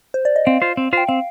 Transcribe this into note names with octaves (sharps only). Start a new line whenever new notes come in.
C5
D5
D#5
C4 F5
F4 C5
C4
F4 C5 G5
C4 F5